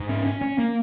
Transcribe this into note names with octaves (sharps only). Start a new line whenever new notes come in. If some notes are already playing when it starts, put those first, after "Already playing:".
Already playing: G#2
C#4
C#4
C#4
A#3